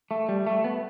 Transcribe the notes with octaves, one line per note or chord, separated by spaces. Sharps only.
A3
G3
A3
B3